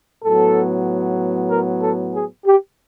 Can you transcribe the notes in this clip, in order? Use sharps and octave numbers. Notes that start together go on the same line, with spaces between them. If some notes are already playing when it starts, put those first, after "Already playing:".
A2 F#3 B3 A4
A#4
A4
G#4
G4